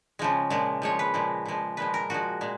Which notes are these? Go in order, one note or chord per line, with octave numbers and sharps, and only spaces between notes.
C#3 F3 G#3
A#2 F3 G#3
A#2 F3 G#3 C#5
B4
A#2 F3 G#3
A#2 F3 G#3
A#2 F3 G#3 B4
A#4
A#2 F3 G#3 F#4
A#2 G#3